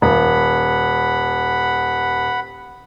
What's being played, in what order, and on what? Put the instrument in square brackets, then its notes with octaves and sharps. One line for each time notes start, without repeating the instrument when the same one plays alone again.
[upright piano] D#1 [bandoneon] F#5 B5